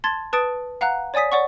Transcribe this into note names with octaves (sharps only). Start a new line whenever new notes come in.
A5 C6 G#6 A6
B4 A5 D#6 A6 D7
F5 F#5 A#5 F#6
C#5 D5 G#5 D#6 B6
C#5 D5 F#5 C#6